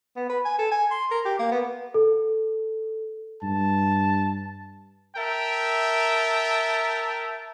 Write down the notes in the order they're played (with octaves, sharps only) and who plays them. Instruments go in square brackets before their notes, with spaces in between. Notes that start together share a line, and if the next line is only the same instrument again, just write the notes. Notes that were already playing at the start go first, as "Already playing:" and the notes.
[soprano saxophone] B3
B4
G#5
A4
G#5
C6
A#4
G4
A#3
B3
[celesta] A4
[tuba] G2 [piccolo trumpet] A5
[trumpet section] A#4 E5 G5 A5